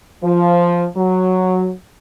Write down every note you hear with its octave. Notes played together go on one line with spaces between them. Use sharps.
F3
F#3